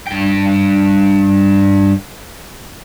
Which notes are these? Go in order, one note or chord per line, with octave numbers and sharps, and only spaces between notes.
G2 G5